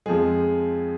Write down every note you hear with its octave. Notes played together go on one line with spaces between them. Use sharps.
F2 F3 G#3 G#4